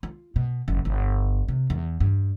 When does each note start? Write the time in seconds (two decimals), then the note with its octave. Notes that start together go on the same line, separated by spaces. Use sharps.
0.03 F4
0.36 B2
0.68 F#1
0.85 G1
1.48 C3
1.70 E2
2.00 G2